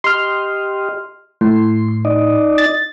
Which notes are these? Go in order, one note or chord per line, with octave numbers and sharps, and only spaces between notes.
G4 D#5 C6 F6
A2 C6
D#4 D5 D#5
A6